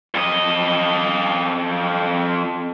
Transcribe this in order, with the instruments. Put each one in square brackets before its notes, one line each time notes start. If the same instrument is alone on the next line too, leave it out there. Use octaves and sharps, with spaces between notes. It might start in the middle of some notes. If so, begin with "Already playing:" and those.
[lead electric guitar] F2 D#5